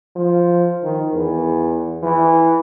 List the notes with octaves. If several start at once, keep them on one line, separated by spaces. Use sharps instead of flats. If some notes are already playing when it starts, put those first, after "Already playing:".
F3
D#3
E2
E3